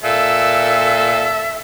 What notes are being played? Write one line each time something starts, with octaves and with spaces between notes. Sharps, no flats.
A#2 A4 E5